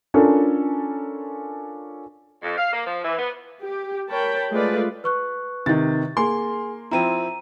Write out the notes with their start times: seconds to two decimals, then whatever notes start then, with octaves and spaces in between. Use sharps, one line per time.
0.14 C#4 D4 F4 A4 A#4
2.43 F2
2.58 F5
2.73 A#3
2.87 F3
3.03 E3
3.18 B3
3.62 G4
4.09 A#4 C#5 G5 A5 B5
4.51 G#3 A3 F4 B4 D5
5.04 B4 C#6 F#6
5.66 C3 D#3 A6
6.17 A#3 G#4 G#5 C6
6.91 F3 C4 E4 A#5 D#7